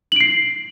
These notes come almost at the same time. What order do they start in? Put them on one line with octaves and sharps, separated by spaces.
F#7 D7 C7